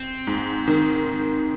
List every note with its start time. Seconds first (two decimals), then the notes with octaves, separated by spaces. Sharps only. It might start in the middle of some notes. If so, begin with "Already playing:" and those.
Already playing: C4
0.27 G#2
0.68 D#3